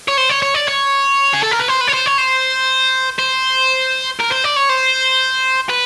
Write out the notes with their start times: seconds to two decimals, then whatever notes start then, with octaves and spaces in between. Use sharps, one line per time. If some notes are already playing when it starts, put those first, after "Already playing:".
0.08 C#5
0.17 C5
0.29 C#5
0.42 C#5
0.54 D5
0.68 C#5
1.33 G#4
1.43 A4
1.51 A#4
1.59 B4
1.68 C5
1.81 B4
1.87 C#5
1.93 C5
2.06 C#5
2.18 C5
3.19 C5
4.20 A#4
4.31 C5
4.44 D5
4.56 C#5
4.69 C5
5.69 B4